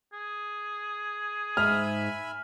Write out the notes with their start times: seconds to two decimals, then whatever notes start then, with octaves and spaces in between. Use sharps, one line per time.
0.13 G#4
1.57 G#2 E5 G#5 B5 F6